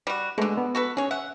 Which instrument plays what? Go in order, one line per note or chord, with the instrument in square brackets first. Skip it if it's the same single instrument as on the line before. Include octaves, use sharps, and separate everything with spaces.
[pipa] G3 F#4
[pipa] B2 D3 [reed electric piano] G#3 A3
[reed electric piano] B3
[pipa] F#4 A4 B4
[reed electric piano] C#4 [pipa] G#4 C#5
[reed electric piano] E5 [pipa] F#5